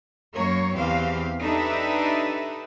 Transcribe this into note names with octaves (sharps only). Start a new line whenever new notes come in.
F#2 A#3 A#4 C#5
E2 C4 G4 F5
D4 D#4 G4 A4 B4 E5